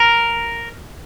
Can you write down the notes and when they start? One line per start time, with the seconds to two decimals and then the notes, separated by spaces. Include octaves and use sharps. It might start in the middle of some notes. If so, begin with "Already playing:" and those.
Already playing: A#4